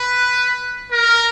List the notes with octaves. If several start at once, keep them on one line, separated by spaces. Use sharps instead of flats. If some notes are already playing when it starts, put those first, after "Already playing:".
Already playing: B4
A#4